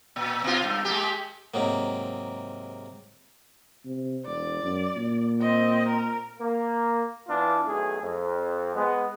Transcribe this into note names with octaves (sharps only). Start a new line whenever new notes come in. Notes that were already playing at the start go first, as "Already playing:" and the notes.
A#2
B2 F4
G2 A3
G#3 A#3 G4
G#2 C3 F#3 A#3
C3
E1 D5
F#2
A#2
C4 D#5
A#4
A#3
E3 B3 D4 F4
B1 A3 G#4
F2
G#3 B3